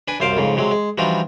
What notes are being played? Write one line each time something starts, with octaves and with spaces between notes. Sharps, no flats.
D4 B4 G#5
C2 F#2 C5 F5 D6
F2 G#2 C#3
C3 F#3 G#3
G#3
E3 F3 G3 D4 D#4 F#4